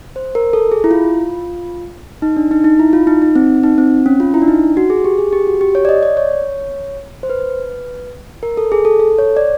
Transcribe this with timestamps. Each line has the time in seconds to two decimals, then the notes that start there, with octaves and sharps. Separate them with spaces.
0.16 C5
0.35 A#4
0.53 A4
0.72 G#4
0.84 E4
0.91 F4
2.22 D#4
2.37 D4
2.51 D#4
2.64 D#4
2.79 E4
2.93 F4
3.07 D#4
3.22 D#4
3.35 C4
3.63 D#4
3.78 C4
4.06 C#4
4.20 F4
4.34 E4
4.42 D4
4.48 D#4
4.77 F#4
4.90 G#4
5.04 G4
5.19 G#4
5.33 G4
5.47 F#4
5.61 G4
5.75 C#5
5.85 D5
5.89 D#5
6.03 D5
6.17 C#5
7.23 C5
7.30 B4
8.43 A#4
8.57 A4
8.72 G#4
8.85 A4
9.00 A4
9.18 C#5
9.37 D5